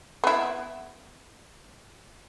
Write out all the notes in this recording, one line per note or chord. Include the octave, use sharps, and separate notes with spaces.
B3 E4